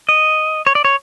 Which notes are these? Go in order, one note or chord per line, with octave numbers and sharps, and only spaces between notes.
D#5
C#5
D5
C#5